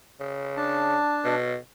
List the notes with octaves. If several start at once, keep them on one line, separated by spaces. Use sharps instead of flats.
C#3
D4 A5
B2